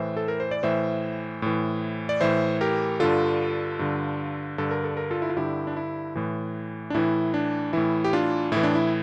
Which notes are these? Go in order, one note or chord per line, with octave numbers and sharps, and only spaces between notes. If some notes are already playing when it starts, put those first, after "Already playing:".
Already playing: A2 E3 C5 E5
A4
A#4
C5
D5
A2 E3 C5 E5
A2 E3
D5
A2 E3 C5 E5
G4 A#4
G2 D3 F4 A4
G2 D3
G2 D3 A4
A#4
A4
A#4
F4 A4
E4
F4
G2 D3 E4 G4
D4
E4
A2 E3
D4
A2 E3 E4
D4
A2 E3 E4
G4
D4 F4
A2 E3 E4
D4
E4